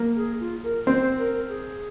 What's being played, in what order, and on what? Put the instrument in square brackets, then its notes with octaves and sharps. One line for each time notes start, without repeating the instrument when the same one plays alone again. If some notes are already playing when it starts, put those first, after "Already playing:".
Already playing: [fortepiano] A#3
[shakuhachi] G#4
F4
A#4
[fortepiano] C4 [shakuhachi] C5
[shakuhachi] A#4
G#4